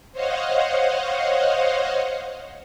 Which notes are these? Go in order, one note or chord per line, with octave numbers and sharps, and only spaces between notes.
C5 C#5 D#5 F5 F#5